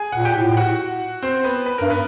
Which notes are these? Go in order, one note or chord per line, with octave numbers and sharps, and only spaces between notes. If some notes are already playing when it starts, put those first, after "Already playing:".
Already playing: G#4 G#5
A#2 F#5
G4 G5
A2
F#4 F#5
C4 C5
B3 B4
B4
G2 A#4
B3 B4